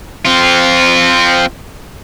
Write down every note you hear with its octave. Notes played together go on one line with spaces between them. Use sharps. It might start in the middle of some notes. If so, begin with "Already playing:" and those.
C4 F4